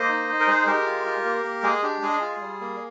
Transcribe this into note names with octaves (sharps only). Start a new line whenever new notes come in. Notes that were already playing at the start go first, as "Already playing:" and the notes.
Already playing: A#3 C5 D#5
D#4
D#4
A#4
G#3 G#4 C5
G#3 G4 A#4
F4
F4
A#3
A#3
G#3 G#4
D4 G4
G#3 G#4
F4
G3
A#3